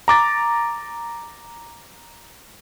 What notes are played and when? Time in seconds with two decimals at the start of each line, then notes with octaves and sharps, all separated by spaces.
0.08 A#5 D6 A6